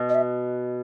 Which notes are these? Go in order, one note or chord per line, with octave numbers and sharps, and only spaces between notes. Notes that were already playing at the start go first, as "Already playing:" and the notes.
Already playing: B2
D#5
E5